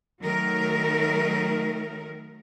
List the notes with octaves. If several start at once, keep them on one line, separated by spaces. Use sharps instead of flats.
D#3 F#3 A3 A#4